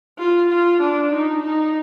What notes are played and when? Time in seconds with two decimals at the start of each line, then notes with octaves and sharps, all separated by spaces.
0.19 F4
0.50 F4
0.81 D4
1.13 D#4
1.43 D#4